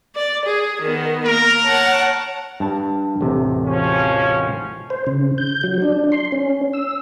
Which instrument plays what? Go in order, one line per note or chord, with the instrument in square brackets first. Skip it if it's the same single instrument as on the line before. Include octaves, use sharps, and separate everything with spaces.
[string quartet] D5
G#4
D#3 B3
[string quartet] A#3 [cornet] A#4
[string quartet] C#5 F#5 A5
[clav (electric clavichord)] G2 A5
A1 E2 C3
[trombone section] G#1 F3 C#4
[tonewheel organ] C5
C#3
G6
F#3
D4
C6
C#4
E6